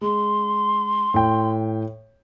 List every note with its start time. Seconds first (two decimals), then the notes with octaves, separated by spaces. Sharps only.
0.01 G#3 C6
1.14 A2 G5